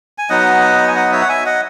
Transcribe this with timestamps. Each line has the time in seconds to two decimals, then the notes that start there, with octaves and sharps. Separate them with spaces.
0.18 G#5
0.30 F#3 B3 D#4 D#5 F#5
0.88 G#5
0.96 D#5 F#5
1.12 C#5 E5
1.22 F#5
1.29 E5 G#5
1.46 D#5 F#5